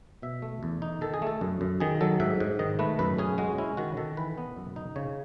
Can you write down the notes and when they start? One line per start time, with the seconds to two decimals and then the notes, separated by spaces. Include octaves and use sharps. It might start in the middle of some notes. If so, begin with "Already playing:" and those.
0.22 B2 E5
0.42 A3
0.63 E2
0.82 D#4
1.01 D#3 A4
1.14 G#4
1.22 A3 A4
1.41 F#2
1.61 F#2
1.80 D#3 G#4
2.01 F#3 A4
2.20 G#2 E5
2.40 G#2
2.59 D#3 D#5
2.79 A3 B4
2.99 F#2 B4
3.18 C#4 G#4
3.38 G#3 F#4
3.58 C#4 E4
3.77 D#3 F#4
3.97 D#3 A4
4.17 E3 B4
4.38 B3
4.56 F#2
4.76 D#4
4.96 C#3 C#5